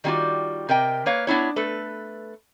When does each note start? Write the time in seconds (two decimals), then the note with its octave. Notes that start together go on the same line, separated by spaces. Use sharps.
0.04 D#3 G3 A3 C4 F4 F#4
0.69 C3 A#4 D#5 G5
1.06 A#3 B4 C#5 F5
1.27 B3 D4 E4 C#5
1.56 A3 A4 B4